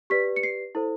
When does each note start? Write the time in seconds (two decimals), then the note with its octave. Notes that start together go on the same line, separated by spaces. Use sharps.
0.10 G4 B4 D5 B6
0.36 C#7
0.43 C7
0.75 E4 A4 C5